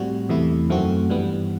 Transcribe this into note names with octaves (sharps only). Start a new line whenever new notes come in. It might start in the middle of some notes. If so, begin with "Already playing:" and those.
Already playing: A2 G3 C4 F#4
E2 C3 E3 A3 E4
F#2 D#3 A3 C4 F#4
G2 E3 G3 B3